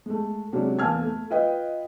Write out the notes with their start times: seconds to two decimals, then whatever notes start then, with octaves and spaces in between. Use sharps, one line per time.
0.06 G#3 A3
0.53 C3 F#3 G#3 C#4 D4
0.79 E2 A#3 G#5 A5 F6 G#6
1.02 A3
1.30 F4 B4 D#5 G5